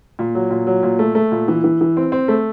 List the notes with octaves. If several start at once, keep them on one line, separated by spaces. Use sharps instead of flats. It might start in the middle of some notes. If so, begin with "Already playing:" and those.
A#2
F#3
A#2
F#3
A#2
A3
A3
A#2
E3
E3
E3
C4
C4
A3